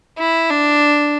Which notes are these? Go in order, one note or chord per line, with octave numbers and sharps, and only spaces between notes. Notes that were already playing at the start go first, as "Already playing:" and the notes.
E4
D4